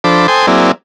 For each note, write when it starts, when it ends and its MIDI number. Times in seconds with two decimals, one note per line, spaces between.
0.04 0.27 53
0.04 0.27 62
0.04 0.27 69
0.04 0.27 72
0.04 0.27 83
0.04 0.27 86
0.28 0.46 69
0.28 0.46 72
0.28 0.46 79
0.28 0.46 80
0.28 0.46 84
0.28 0.46 87
0.47 0.72 54
0.47 0.72 58
0.47 0.72 60
0.47 0.72 64
0.47 0.72 68
0.47 0.72 74